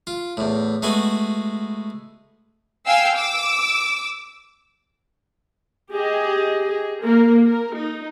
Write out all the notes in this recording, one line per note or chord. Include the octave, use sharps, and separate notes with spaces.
F4
E2 A2
G#3 A3 B3 F#4 G#5
F5 G5 G#5 E6 C7
D6 E6
G4 G#4 D#5
G#4
A#3 A#4
A#4
D#4